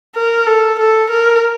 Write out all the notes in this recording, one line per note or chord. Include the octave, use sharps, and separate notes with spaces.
A#4
A4
A4
A#4